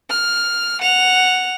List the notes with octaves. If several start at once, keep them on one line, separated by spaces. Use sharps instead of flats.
F6
F#5 F7